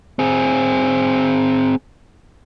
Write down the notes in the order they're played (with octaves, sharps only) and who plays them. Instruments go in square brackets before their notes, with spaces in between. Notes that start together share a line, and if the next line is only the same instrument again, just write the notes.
[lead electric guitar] C4 G#4